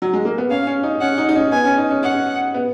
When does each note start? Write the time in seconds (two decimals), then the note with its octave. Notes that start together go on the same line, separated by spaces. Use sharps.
0.02 F#3
0.13 G#3
0.25 A#3
0.38 B3
0.50 C#4 F5
0.67 C#4
0.83 D#4
1.01 C#4 F#5
1.18 D#4
1.29 D#4
1.35 C#4
1.52 B3 G#5
1.65 C#4
1.77 D#4
1.90 C#4
2.03 C#4 F#5
2.54 B3